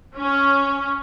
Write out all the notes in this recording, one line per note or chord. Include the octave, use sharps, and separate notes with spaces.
C#4